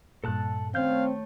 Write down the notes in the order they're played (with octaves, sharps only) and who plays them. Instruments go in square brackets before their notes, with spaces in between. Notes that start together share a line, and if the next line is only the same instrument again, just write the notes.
[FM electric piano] G2 A#2 [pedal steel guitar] A4 A5 F#6
[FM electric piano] D#3 C#4 [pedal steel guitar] A3 C#5 G6 [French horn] C4 [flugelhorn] F5